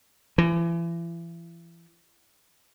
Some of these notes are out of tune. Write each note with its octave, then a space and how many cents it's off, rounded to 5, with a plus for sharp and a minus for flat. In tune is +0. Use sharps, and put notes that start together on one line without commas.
E3 +35